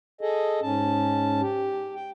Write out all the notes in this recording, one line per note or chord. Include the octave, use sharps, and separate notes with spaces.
G#4 A4 D#5
G#2 C#4 A5
G4
G5